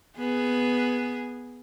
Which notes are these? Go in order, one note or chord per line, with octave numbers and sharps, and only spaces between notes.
B3 G#4